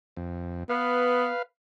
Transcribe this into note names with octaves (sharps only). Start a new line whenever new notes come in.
F2
B3 B4 F5